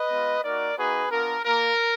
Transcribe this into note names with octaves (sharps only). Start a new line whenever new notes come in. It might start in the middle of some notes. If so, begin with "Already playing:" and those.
Already playing: B4 D#5
G#3 B3 F4
A#3 D#4 F#4 A#4 D5
A#3 D#4 F#4 G#4 B4
B3 D4 F4 A#4
A#3 F4 A#4